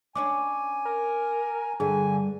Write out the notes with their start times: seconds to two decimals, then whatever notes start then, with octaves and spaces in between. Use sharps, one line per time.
0.15 C#4 D4 C#5 G#5 D6
0.85 A#4
1.80 G2 D3 G3 G#4 G#5